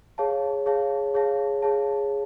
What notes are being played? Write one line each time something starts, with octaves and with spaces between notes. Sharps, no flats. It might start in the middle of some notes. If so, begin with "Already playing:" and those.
G#4 C#5 F5 A5
G#4 C#5 F5 A5
G#4 C#5 F5 A5
G#4 C#5 F5 A5